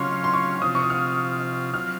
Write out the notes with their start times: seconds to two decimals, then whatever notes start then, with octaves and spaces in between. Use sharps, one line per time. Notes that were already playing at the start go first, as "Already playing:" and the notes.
Already playing: C#3 F#3 C#4 F4 F5 C6 C#6
0.24 C6
0.33 C#6
0.62 C3 F3 C4 F4 D#6
0.75 C#6
0.82 D#6
0.90 F6
1.74 F#3 C4 F4 F6